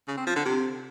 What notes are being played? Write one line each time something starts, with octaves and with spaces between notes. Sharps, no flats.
C#3
C4
F3
D3
C3